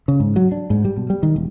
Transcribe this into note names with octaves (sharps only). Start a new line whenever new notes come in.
C#3
G#2
F#3
D4
G#2
G3
B2
G3
D#3
E1